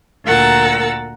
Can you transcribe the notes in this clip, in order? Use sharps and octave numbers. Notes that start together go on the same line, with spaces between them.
D2 A#2 A#4 F#5 E6 A6